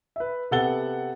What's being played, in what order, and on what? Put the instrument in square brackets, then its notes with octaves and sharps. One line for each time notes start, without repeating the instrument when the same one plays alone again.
[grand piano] B4 E5
C3 B3 A4 F#5 A6 G7